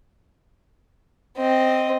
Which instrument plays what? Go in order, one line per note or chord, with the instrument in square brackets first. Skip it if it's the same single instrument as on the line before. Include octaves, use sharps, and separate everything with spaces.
[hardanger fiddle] C4 D#5